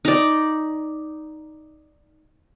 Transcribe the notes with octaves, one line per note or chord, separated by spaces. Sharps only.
D#4 D5